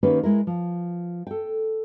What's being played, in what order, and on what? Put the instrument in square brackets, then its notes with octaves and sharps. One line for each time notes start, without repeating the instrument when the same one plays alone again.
[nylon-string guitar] D#3 A#3 C#4 G4 B4
G#3 E4 A#4
F3
A4 G5